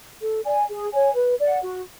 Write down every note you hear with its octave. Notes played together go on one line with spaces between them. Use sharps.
A4
D5 G#5
G#4
C#5 G#5
B4
D5 F#5
F#4